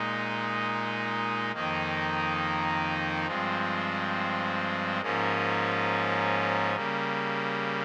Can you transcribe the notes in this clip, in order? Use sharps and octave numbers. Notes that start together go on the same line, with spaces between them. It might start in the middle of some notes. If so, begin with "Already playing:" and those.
Already playing: A#2 G#3 D#4
F2 D#3 A#3 D#4
G2 F3 G#3 C4
G#2 F3 A#3 C#4
C#3 G3 A#3